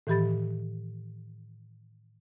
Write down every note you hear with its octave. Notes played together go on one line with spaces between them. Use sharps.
A2 D#3 E3 G4 B5 A6